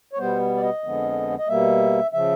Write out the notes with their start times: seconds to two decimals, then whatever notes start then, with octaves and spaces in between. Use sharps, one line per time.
0.13 C#5
0.18 B2 G3 B3 C5
0.56 D5
0.62 D#5
0.83 F2 D3 F3 G#3 B3
1.38 D#5
1.48 B2 G3 A#3 E5
2.13 C#3 F3 E5